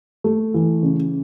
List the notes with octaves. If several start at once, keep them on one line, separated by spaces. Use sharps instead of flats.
A3
E3
C#3